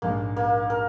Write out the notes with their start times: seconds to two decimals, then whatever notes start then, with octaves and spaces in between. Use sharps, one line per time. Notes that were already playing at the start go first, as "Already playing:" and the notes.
0.02 A#1 G#2 G#3 A#3
0.36 A#3
0.70 A#4